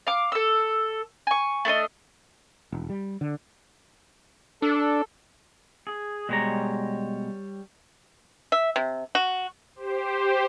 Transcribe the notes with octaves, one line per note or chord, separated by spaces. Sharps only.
F5 D6
A4 E6
G#5 C#6
A3 D4 A4 D#5
E1
G3
D3
D4 A4
G#4
B2 G3 G#3 C#5 A#5
E5
C3
F#4
G4 C5